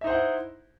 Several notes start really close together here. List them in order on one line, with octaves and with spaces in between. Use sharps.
E5 D#4 C5 F#5 E4